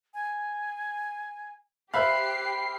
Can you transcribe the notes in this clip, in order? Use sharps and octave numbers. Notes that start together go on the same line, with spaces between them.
G#5
G4 C5 E5 F5 G5 B5 F#6 C7